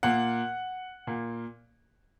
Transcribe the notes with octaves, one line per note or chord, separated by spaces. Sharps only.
A#2 A#3 F#5
A#2 A#3